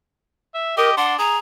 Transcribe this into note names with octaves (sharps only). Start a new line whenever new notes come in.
E5
G4 A#4 D#5
D4 F#5 C6
G#4 A#5